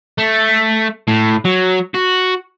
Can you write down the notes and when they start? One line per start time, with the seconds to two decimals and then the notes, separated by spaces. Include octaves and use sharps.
0.18 A3
1.08 A2
1.45 F#3
1.94 F#4